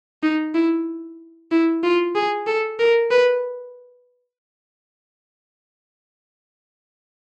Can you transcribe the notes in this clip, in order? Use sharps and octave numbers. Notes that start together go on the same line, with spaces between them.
D#4
E4
E4
F4
G#4
A4
A#4
B4